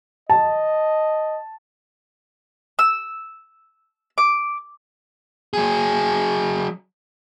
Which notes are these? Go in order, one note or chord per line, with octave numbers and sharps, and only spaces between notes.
D#5 A5
E6
D6
F#3 G#4